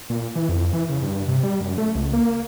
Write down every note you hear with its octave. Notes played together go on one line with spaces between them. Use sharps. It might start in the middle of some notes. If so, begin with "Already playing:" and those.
A#2
E3
F2
E3
C#3
G2
C3
G3
F#2
A3
C#2
A#3